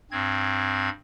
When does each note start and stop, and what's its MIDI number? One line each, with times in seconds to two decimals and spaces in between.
0.11 0.89 43
0.11 0.89 60
0.11 0.89 92